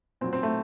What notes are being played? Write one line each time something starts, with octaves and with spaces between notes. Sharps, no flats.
A#2 F#3 C4
C4
A3